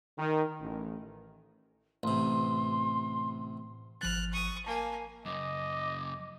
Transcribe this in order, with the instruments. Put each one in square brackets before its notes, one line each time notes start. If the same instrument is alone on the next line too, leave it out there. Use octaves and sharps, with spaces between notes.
[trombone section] D#3
A1
[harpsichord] A1 C3 [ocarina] C6
[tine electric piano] G#1 F3 A6 [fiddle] F6 F#6
[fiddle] C#6 D#6
[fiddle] A#3 G#5 [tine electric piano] A5
[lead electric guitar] F#2 C#3 [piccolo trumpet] D#5 [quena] D6